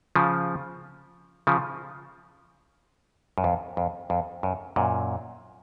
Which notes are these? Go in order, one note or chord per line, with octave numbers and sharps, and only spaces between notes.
C#3 F3
C#3 F3
F#2
F2
F2
F2
F#2
F#2 A#2